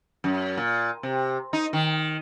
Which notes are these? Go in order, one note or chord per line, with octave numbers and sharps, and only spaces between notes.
F#2
A#2
C3
D#4
D#3